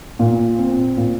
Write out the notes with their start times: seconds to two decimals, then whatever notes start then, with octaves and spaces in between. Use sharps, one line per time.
0.19 A#2
0.58 C4
0.97 A#2